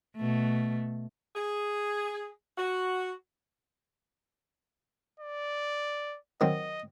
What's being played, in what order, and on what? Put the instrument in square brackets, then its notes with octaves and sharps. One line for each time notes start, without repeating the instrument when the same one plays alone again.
[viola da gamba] B2 A3
[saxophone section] G#4
F#4
[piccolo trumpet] D5
[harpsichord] D#3 F#3 C4 [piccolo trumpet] D#5